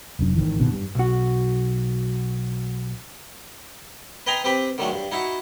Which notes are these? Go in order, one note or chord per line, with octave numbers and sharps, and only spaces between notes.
F1 F#2 D4
G#1 D#2 D#3 E3
G1 B2 D#3 D4
G2
B1 F#4
B4 D#5 G5 G#5 A#5 C6
C4 G4 B4 G5 B5
D3 D#3 F#3 G#3 A3
G2
D#4 E4 F#4 C#6